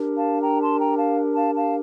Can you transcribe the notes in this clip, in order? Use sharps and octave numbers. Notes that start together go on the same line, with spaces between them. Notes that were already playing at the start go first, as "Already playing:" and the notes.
Already playing: D4 G4 A#4
F5 A5
G5 A#5
A5 C6
G5 A#5
F5 A5
F5 A5
F5 A5